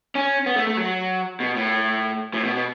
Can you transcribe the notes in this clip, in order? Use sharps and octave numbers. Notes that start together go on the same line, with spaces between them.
C#4
B3
A3
A3
F#3
B2
A2
A2
B2
B2